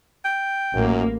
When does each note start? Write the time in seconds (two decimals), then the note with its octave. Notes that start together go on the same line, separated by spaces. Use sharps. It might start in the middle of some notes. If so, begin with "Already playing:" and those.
0.25 G5
0.74 A1 F#2 A#3